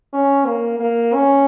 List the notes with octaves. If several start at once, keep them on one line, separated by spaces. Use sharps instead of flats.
C#4
A#3
A#3
C#4